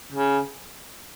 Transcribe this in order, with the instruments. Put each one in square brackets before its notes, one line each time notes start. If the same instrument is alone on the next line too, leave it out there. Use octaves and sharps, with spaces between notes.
[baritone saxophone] C#3